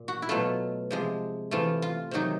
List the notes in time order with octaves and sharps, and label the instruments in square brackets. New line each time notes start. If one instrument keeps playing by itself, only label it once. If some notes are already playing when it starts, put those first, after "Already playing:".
Already playing: [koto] A#2
F#4
E4
B2 F#3 A3 F4
C3 F3 G#3
C3 E3 A3 F4
F4
C3 D#3 F#3 D#4